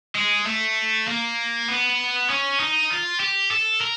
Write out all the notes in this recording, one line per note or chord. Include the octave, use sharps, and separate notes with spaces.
G#3
A3
A#3
B3
C#4
D#4
F4
G4
A4
A#4